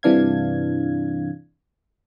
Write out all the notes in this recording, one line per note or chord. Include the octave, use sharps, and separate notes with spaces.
G2 C3 E3 D4 F5 G#6